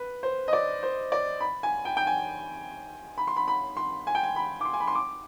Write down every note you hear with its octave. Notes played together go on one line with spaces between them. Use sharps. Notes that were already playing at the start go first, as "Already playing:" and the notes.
Already playing: B4
C5
D#5
D5
C5
D5
B5
G#5
G5
G5
G#5
B5
C6
B5
B5
C6
G#5
G5
G#5
B5
D6
C6
G#5
B5
C6
D6